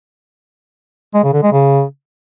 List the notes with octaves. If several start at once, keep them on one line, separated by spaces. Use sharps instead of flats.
G#3
C#3
D3
G#3
C#3